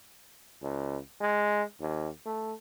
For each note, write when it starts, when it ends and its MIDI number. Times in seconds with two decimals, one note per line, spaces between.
0.62 0.98 37
1.21 1.63 56
1.81 2.09 39
2.26 2.54 57